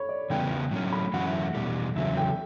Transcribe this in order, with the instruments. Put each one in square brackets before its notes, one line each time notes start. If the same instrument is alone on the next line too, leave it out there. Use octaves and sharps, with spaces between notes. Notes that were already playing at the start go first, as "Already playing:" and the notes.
Already playing: [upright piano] C#5 B5
D5
[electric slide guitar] E2 C#3 G3 B3 [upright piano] G5
[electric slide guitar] A2 F#3 C#4
[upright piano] B5
[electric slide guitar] F#2 E3 A3 C#4 F#4 [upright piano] F#5
[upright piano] E5
[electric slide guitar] E2 B2 G3
[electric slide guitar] E2 C#3 F#3 [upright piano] E5
[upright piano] G5